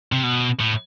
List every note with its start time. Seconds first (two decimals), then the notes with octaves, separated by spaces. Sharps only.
0.12 C3
0.23 B2
0.60 A2